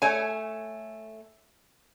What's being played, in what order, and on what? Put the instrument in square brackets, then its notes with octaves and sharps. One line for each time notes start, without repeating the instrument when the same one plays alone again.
[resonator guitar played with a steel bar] A3 C#5 G#5